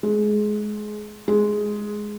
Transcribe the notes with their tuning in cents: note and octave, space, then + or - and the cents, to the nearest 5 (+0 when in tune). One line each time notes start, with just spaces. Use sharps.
G#3 +20
G#3 +5